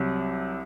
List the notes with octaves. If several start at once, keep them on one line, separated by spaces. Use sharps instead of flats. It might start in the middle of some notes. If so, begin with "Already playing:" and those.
Already playing: C2 C3 F#3